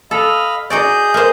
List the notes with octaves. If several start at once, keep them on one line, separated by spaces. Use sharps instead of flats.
A4 D#5 F5 B5
D#4 F#4 G#4 D5 D#5 G6
A#3 C5